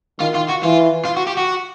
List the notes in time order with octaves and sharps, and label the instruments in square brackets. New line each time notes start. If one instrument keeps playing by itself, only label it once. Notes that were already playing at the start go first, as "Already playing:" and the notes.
[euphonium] D#3 [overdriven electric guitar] F4
[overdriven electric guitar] F4
F#4
[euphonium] E3 [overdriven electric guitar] F4
[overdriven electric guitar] F4
F#4
G4
F#4